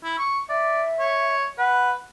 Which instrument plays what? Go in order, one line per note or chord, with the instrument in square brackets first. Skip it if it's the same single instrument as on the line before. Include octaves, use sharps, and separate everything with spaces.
[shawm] E4
C#6
[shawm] D5 [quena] E5
[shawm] C#5
[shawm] B4 [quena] F#5